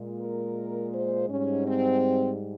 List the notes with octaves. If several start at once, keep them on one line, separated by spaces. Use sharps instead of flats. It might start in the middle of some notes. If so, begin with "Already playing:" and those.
Already playing: A#2 G#3
A#4
C5
G#2 G3 C#4
C4